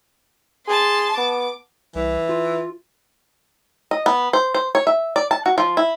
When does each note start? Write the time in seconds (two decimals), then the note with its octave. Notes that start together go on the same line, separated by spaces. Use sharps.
0.67 G#4 A5 C6
1.18 B3 D6
1.95 C2 E3
2.29 F4
3.91 D#5
4.06 B3
4.33 C5
4.54 C5
4.75 C#5
4.87 E5
5.16 D5
5.31 A5
5.46 F#4
5.58 F3
5.77 E4